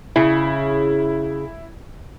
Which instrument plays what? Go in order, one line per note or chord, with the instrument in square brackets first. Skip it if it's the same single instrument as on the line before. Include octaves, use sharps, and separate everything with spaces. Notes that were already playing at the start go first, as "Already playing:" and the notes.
[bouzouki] C#3 [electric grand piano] E4